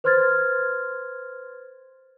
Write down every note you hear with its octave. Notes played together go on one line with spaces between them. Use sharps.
B4 C5 C6 F6 G#6 A6